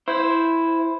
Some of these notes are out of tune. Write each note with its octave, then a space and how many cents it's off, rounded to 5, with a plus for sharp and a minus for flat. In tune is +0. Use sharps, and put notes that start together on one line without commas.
E4 +0 C5 +0